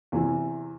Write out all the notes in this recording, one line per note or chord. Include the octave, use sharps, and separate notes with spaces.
E2 C3 E3